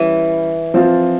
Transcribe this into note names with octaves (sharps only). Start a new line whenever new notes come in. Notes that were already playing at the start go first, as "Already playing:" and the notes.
Already playing: E3 G3 C#4
F3 C4 F4